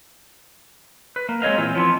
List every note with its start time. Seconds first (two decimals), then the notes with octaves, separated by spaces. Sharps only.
1.16 B4
1.29 A#3
1.42 G#3 C4 C#5 D#5 F5
1.58 A#2 E3 C4 F4
1.75 F3 B3 C4